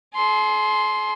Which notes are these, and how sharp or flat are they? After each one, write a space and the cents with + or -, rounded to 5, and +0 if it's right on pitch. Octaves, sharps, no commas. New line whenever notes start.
G#4 +45 C6 +0